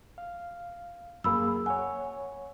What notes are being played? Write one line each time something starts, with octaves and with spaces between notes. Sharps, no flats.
F5
F#2 A#3 G#4 B5 E6
C#5 F#5 G#5